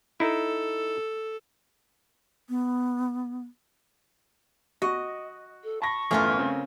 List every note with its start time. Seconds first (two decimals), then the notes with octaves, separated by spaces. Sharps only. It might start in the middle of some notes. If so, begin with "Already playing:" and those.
0.20 D#4 E4 A4
2.49 B3
4.82 F#4 D#5
5.64 A4
5.82 A5 B5 C#6 A#6
6.11 G1 E2 A3 C#4 F4 A#4 C6
6.39 C#3 C4